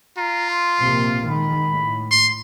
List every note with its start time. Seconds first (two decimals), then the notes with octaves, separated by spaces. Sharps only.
0.18 F4 A#5
0.50 C6
0.81 A#1 C3 A#3
1.29 D#3 G#3 B5
1.71 A2
2.11 C6